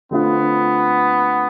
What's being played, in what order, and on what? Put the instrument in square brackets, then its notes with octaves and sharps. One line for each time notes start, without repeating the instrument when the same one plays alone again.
[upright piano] D3 A3 C4 F4 [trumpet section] B3